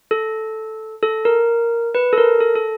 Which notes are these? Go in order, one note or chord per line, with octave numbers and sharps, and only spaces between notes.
A4
A4
A#4
B4
A4
A#4
A4
A4